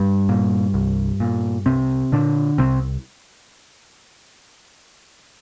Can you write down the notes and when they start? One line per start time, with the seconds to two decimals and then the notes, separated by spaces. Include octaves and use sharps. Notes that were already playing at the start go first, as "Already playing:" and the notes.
Already playing: G2 G3
0.29 A#2
0.74 C2
1.20 A#2
1.66 C2 C3 C4
2.12 A#2 D3 D4
2.58 C2 C3 C4